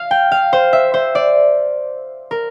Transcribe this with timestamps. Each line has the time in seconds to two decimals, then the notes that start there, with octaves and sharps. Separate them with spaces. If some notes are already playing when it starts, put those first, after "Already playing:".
Already playing: F5
0.11 G5
0.32 F5
0.53 C5
0.73 E5
0.94 C5
1.15 D5
2.31 A#4